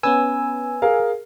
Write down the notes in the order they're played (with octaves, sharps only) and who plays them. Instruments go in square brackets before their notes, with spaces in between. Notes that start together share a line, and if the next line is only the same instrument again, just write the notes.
[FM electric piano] B3 C#4 B4 [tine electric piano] G#5 E6
[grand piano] G#4 A#4 F5